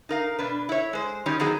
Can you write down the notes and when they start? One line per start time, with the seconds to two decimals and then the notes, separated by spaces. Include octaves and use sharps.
0.09 D#4 A#4 F5
0.39 B2 D4 B4
0.69 E4 C#5
0.93 G#3 C5
1.26 D#3 G3 C#4 D#4 C#5
1.40 D#3 F3 F#3 B3 D#4 G#4